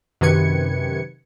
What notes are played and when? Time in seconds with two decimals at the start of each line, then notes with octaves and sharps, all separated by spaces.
0.21 F#2 C3 D#3 B4 G#6 C#7